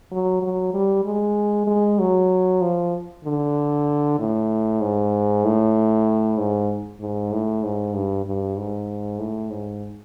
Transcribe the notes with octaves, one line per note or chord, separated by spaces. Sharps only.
F#3
F#3
G3
G#3
G#3
F#3
F3
D3
A2
G#2
A2
G#2
G#2
A2
G#2
G2
G2
G#2
A2
G#2